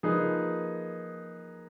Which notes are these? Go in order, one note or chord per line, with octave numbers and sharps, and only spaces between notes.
F3 A#3 D#4 G#4 B4